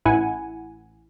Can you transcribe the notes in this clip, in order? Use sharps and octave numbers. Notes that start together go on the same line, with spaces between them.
A1 E4 F#5 G#5